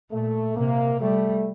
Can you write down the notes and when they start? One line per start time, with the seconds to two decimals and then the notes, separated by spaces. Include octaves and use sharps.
0.11 A#2 A3
0.55 C3 A#3
1.00 G3 A3